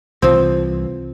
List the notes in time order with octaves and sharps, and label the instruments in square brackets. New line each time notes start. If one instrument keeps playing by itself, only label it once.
[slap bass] C2 E3 [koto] F3 C4